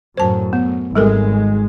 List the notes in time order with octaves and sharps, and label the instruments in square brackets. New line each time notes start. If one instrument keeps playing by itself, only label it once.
[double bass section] F#2 A2 [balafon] C5 A5
[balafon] B3
[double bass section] G#1 G#3 [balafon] G3 A4 A#4